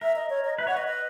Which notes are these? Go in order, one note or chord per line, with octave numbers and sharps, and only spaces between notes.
A#4 E5
D#5
C#5
D#5
B4 E5
C#5 F#5
B4 D#5
D#5